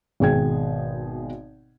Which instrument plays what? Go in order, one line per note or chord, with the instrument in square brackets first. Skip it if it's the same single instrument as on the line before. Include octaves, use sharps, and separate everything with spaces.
[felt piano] G#1 B2 G#4 G5 G#6